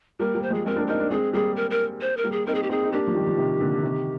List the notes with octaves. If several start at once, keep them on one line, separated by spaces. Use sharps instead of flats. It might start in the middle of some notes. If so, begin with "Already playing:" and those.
G3 A#3 A#4
G3 A#3
C5
F3 G#3 G#4
G#3 C4 A#4
A#3 D4
C4 D#4 A#4
D4
G#3 C4 G#4
G3 A#3 G#4
A#4
A#4
C5
A#4
G3 A#3
G#4
C4 D#4 A#4
G#4
G4
C4 D#4 G#4
D#4
A#3 D4 G4
F3
D#3 G3
F3
C3 D#3
A#2 D3
C3 D#3